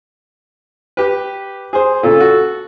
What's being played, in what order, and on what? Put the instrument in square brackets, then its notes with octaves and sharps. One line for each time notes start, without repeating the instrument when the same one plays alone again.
[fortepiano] G4 B4
G#4 C5
[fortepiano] A#2 C#3 [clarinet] A4
[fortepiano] F#4